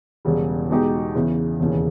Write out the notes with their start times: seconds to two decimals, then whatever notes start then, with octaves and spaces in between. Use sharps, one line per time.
0.25 E1 E2 C#3 G3
0.70 E2 B2 G#3 D#4 G4
1.15 E2 C#3 E3
1.60 E1 D#2 C#3 E3